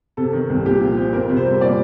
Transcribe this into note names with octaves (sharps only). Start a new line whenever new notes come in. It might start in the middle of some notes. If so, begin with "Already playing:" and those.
C3 A4
D#3
C2
A#2 G4
F3
C4
F2 A#4
C3
C5
G3
A#2 D5